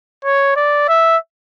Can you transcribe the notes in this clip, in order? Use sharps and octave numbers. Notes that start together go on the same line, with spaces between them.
C#5
D5
E5